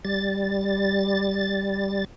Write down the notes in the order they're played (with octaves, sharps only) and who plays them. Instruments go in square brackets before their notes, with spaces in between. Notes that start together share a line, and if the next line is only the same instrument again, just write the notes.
[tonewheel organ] G3 A6